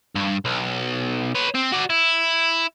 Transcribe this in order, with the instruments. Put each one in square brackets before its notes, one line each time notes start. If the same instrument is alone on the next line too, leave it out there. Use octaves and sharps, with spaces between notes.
[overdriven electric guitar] G2
B1
B4 C#5
C4
F#4 D5
E4